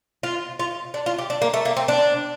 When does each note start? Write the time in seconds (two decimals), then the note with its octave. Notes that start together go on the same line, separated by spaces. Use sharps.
0.23 F4
0.59 F4
0.94 D4
1.06 F4
1.18 G4
1.30 D4
1.42 A#3
1.54 A3
1.65 A#3
1.77 C4
1.88 D4